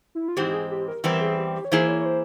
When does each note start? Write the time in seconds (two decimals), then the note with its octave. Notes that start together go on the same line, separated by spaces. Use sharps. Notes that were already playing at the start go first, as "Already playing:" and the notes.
0.15 E4
0.28 F4
0.37 G#2 E3 G#3 C4 G4
0.47 G4
0.53 G#4
0.71 G4
0.88 A#4
1.04 E2 E3 G3 C4 E4 A#4
1.21 G#4
1.38 G4
1.54 G4
1.65 C#5
1.71 E3 A#3 E4 G#4 C5
1.88 C#5
2.00 C#5
2.05 C5